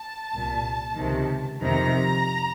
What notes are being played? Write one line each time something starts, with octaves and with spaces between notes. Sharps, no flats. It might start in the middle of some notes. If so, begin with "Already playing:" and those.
Already playing: A5
C2 A#2
C#2 C3 D#3
F2 C3 D#3 A#5